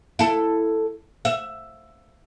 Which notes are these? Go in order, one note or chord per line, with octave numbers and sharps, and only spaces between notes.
E4 A4
E5